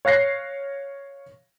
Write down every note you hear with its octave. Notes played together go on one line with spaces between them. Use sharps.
C#5 F5 F#6 A#6 C7